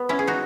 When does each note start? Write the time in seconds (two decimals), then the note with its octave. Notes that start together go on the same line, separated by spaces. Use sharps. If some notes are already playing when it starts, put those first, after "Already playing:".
Already playing: B3
0.09 C#4 E4
0.19 G#4
0.27 D#4 F#4